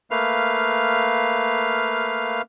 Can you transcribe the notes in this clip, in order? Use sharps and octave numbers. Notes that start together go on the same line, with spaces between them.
A3 A#3 B4 F5 F6